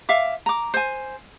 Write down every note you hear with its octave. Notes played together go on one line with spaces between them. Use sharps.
E5 F5 D6
A#5 D6
C5 G#5